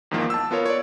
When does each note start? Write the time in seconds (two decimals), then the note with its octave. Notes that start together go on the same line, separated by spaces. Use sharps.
0.11 E2 G#2 D#3 F3 A#3
0.30 A5 E6
0.51 B3 F4 A#4 C#5
0.66 C#5 D5